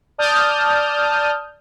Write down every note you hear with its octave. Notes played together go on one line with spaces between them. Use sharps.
D5 A5 D#6 F6 G6